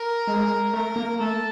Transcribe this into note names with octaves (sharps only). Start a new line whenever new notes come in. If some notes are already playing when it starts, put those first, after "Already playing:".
Already playing: A#4
G#3
A3 A#4
A#3
A3 A4